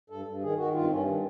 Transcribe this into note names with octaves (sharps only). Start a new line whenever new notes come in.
G2 A4
G2
D#3 G#4
D#3 F#4
G2 F4
C4
G2 C#4
D#3